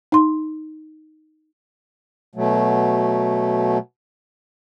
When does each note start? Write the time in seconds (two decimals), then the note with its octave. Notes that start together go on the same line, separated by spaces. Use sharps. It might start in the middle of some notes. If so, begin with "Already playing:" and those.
0.12 D#4 C6
2.35 B2 F#3 A3